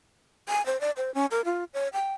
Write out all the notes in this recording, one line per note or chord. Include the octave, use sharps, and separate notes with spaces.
G#5
C5
D5
C5
C#4
A#4
F4
C#5
G5